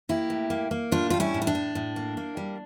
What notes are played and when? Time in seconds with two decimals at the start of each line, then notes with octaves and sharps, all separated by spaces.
0.09 A#3 E4 G4
0.30 A2
0.50 A#3
0.71 A#3
0.92 A2 D4 F4
1.10 G3 F4
1.20 C#4 E4
1.34 A2
1.42 E4
1.47 D4
1.55 A2
1.75 A2
1.96 A#3
2.17 A#3
2.37 G3